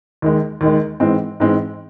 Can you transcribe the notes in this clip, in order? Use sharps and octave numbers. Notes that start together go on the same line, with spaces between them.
D#2 D#3 G#3
D#2 D#3 G#3
G#2 E3 G#3 C4
G#2 E3 G#3 C4